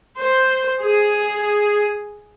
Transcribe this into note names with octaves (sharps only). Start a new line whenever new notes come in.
C5
G#4